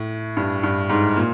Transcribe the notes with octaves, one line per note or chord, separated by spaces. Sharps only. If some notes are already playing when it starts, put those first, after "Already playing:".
Already playing: A2
G2
G2
G#2
A#2